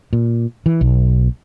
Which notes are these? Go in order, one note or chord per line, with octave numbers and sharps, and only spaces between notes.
A#2
E3
B1